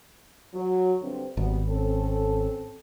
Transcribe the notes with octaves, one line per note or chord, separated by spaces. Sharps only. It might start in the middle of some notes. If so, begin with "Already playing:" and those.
F#3
G2 D3 C4
G#1 F#3 G3 B3
C4 C#4 A4